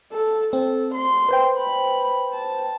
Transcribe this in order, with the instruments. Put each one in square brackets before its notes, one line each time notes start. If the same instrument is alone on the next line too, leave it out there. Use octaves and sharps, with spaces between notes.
[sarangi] A4
[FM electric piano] C4 [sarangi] A4
[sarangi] C6
[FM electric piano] B4 C5 G5
[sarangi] B5
A5